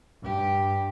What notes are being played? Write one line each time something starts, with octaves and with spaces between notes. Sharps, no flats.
G2 G4